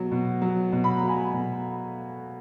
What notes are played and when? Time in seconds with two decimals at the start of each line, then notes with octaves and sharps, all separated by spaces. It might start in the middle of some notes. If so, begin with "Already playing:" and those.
Already playing: B2 F#3
0.11 B2
0.42 F#3
0.72 B2
0.84 B5
0.97 A#5
1.03 F#3
1.08 G#5 B5
1.33 B2